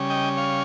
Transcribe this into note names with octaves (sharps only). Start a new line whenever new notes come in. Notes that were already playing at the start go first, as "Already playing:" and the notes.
Already playing: C#3 G3 C#4
D#5 G5
C#5 F5